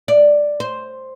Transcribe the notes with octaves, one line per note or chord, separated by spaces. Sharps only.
D5
C5